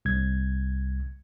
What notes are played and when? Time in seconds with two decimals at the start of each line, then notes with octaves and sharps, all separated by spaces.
0.05 C2 G#6